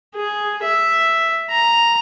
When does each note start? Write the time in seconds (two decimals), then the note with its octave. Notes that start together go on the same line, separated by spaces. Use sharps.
0.15 G#4
0.63 E5
1.51 A#5